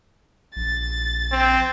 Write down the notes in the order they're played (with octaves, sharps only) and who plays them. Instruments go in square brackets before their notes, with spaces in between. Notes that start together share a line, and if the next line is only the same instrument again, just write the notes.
[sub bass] A#1 [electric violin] A6
[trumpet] C4